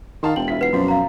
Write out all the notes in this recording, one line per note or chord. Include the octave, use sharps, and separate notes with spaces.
D#3 F5 A5 C6
E1 G5 F#7
E4 F4 B6
B4 F#5 C7
F#2 B2 F3 C4 F#4
F5 A#5